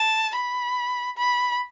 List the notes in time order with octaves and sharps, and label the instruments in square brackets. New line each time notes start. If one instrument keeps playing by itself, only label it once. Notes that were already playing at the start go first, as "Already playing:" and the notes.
Already playing: [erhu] A5
B5
B5